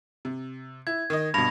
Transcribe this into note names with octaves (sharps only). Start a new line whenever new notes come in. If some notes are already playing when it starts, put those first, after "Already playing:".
C3
E4 G#6
D#3 D#5
G2 B2 B5 A#6 F7